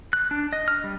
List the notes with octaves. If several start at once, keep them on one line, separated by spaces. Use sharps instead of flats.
F#6
D4
D#5
F6
G3